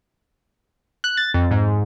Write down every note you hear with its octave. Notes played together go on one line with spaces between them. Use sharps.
F#6
A6
F2
G#2